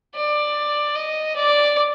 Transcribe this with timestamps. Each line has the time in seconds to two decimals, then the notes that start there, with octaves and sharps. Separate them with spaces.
0.15 D5
0.95 D#5
1.36 D5